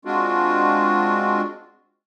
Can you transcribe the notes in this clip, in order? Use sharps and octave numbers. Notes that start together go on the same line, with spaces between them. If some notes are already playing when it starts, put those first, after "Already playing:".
G#3 C4 D4 F4 F#4